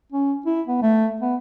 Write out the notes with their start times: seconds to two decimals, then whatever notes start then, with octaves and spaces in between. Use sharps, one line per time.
0.12 C#4
0.46 E4
0.67 B3
0.82 A3
1.21 B3